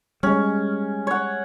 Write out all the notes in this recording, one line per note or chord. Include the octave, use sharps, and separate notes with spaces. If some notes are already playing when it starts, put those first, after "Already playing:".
G3 G#3 C#4
C#5 F#5